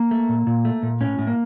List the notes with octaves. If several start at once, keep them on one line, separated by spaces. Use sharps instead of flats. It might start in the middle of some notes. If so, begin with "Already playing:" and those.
Already playing: A#3
A3
A#2
A#2
A3
A#2
A2 C#4
A2
A#3